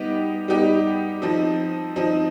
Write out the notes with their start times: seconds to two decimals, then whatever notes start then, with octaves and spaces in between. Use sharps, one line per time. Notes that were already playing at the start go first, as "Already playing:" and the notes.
Already playing: G3 B3 D#4 G4
0.48 G3 B3 D#4 G4
1.22 F3 C4 D#4
1.96 F3 C4 D#4